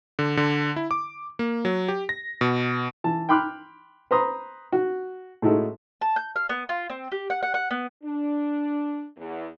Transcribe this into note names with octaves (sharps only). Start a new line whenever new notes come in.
D3
D3
E4
D6
A#3
F#3
G4
A#6
B2
E3 A5
G5 B5 C6 D6 F6 F#6
B4 C5 A#5 C6 D#6
F#4
A2 G#3 D#4 E4 F#4 A4
A5
G6
F5
B3
F4
C4
G4
F#5
F#5
F#5
B3
D4
E2